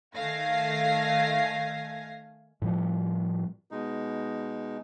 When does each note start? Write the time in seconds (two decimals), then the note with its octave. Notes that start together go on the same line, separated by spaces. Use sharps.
0.16 D#3 A3 F5 G#5 A#6 C7
2.62 A2 F3 G3
3.71 B2 G#3 D#4